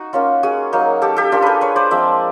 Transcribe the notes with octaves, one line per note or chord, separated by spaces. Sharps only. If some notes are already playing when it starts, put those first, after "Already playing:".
Already playing: D#4 F#4
A#3 C#4 F4
F#4 G#4
F#3 A#3 D#4
G4 A4
G4 A4
A#3 D4 F4 G4 A4
G#4 A#4 B4
B4 C#5
C5 D5
F3 G#3 C4 D5 E5